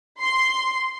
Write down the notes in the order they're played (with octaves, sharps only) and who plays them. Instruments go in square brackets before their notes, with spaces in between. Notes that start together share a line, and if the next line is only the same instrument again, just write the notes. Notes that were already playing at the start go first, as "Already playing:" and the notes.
[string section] C6